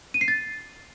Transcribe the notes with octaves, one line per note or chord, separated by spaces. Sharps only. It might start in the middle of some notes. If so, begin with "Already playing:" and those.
D#7
C7
A6